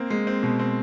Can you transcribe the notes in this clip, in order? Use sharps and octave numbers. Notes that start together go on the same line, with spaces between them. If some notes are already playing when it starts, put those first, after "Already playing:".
Already playing: A#3 C4
G#3
C4
B2
C4